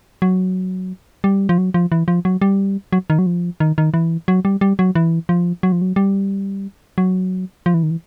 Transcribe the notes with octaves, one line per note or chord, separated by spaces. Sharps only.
F#3
G3
F3
F#3
F3
E3
F3
F#3
G3
F#3
D#3
F#3
F3
D#3
D#3
E3
F#3
G3
G3
F#3
E3
F3
F#3
F3
F#3
G3
F#3
F3
E3
D#3
E3